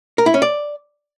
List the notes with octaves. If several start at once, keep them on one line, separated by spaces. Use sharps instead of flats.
A#4
E4
C#4
D5